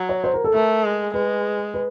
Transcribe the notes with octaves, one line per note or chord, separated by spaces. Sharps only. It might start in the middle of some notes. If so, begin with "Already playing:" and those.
Already playing: F#3
C#5
C5
A#4
A4
A3 A#4
G#3
G#3 B4
B4